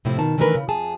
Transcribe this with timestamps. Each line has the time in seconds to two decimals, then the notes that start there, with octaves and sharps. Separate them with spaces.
0.05 A2 C3 F3 A3 C4 E4
0.19 B2 D#3 A5
0.38 D#3 E3 A3 D4 A#4 B4
0.55 C#3
0.69 F2 G#4 A5